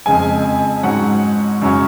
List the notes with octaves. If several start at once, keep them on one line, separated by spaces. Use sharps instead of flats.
F2 C#3 G#3 G#5
G#2 F#3 C#4 F#5
F#2 C#3 F#3 C#4